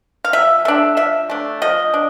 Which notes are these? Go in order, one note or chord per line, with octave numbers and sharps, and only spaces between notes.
F5
F3 E5
A3 D4 E5
F3 E5
A3 D4
F3 D#5
D4